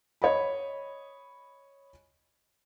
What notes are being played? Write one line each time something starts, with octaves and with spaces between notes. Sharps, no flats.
C#5 D#5 B5